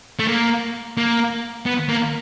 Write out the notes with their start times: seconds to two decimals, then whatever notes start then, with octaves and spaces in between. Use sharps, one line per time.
0.19 A3
0.28 A#3
0.97 A#3
1.66 B3
1.89 A#3